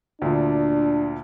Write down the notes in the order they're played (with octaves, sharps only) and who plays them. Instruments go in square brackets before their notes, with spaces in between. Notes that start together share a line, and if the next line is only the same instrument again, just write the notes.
[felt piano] D2 A#2 [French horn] D4